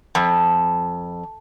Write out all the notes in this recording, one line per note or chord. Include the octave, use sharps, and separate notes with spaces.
F2